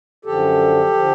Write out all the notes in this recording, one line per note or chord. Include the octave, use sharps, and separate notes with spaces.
F#2 D3 F3 G4 A4
D3 F3